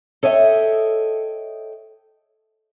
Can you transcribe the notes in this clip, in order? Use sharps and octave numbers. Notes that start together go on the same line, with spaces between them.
A4 C#5 D#5 E5 G5